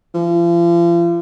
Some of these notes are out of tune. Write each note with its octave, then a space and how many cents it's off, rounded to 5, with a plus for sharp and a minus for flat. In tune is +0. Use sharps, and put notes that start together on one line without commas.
F3 -40